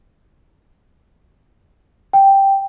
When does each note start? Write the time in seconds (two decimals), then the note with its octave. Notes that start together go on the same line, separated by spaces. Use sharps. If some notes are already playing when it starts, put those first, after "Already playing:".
2.13 G5